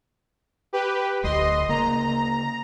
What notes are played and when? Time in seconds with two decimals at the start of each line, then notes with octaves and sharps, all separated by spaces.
0.73 G4 B4
1.23 D1 D2 D#5 C6
1.69 C#3 A#3 A#5